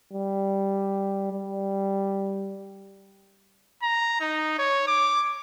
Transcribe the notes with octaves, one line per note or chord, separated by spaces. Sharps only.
G3
G3
A#5
D#4
C#5
D6